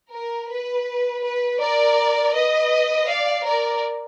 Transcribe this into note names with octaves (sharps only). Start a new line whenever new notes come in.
A#4
B4
B4
A#4 D5
B4 D#5
D5 F5
A#4 D5